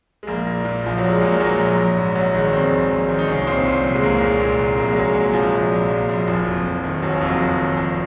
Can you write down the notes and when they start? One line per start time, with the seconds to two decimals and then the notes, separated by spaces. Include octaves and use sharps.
0.23 G#3
0.27 A#1 A#3
0.47 A#2
0.65 A#2
0.84 A#1 F3
0.98 F#3
1.03 A#1
1.09 G#3
1.21 A#2 A#3
1.40 A#2 F#3
1.59 A#1
1.77 A#1
1.96 G#2
2.15 A#1 F#3
2.34 D#3 G#3
2.52 A#1 C4
2.72 G#2
2.91 A#1
3.09 D#3
3.19 D#4
3.28 C2 C#4
3.47 A#2 C4
3.65 A#2
3.83 C2
3.95 G#3
4.03 C2 A#3
4.21 A#2
4.40 A#2
4.59 C2
4.78 A#1 A#3
4.85 G#3
4.93 F#3
4.97 A#2 G#3
5.14 A#2 F#3
5.34 A#1 F3
5.53 A#1
5.72 A#2
5.90 A#2
6.09 A#1
6.27 F#1 F3
6.46 F2
6.65 F#1
6.84 D#3
7.02 F#1 F#3
7.14 F3
7.21 F2 F#3
7.40 F#1
7.58 D#3
7.77 G#1 F3